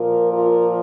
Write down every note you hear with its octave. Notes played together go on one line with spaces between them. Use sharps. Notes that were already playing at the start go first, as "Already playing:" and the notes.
Already playing: A#2 F3 F4 A#4
F4 A#4